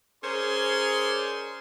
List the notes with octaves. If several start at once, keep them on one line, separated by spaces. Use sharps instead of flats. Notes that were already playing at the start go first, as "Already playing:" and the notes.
C#4 G#4 A#4 C5 D5 C6